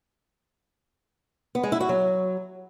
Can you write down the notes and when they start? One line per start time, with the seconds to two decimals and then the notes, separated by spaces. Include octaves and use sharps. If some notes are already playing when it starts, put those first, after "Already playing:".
1.55 B3
1.63 G#3
1.72 E4
1.81 F#4
1.89 F#3